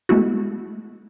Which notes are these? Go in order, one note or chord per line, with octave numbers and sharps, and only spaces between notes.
G#3 A3 B3 E4 F#4